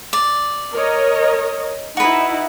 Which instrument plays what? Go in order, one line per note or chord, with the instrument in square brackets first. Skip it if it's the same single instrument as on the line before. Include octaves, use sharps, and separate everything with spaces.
[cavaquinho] D5
[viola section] A#4 C#5 D#5
[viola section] D#4 E4 [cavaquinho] F#4 B4